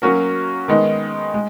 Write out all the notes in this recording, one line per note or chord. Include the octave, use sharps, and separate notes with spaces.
F#3 A#3 C#4 F#4 A#4
D#3 G#3 B3 D#4
G#3